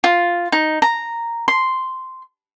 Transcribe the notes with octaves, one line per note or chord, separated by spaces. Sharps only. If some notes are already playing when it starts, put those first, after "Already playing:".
F4
D#4
A#5
C6